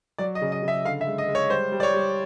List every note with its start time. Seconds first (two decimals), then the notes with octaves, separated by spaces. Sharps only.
0.18 F#3 D5
0.35 D#5
0.42 C#3
0.52 D#5
0.63 C#3
0.68 E5
0.85 D3 F5
1.01 E5
1.07 G#3
1.18 D#5
1.28 G#3
1.35 C#5
1.50 G3 C5
1.72 G3
1.80 D5
1.83 C#5
1.94 G3